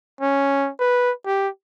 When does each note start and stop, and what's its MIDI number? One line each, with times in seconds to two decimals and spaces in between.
0.21 0.70 61
0.80 1.12 71
1.26 1.48 67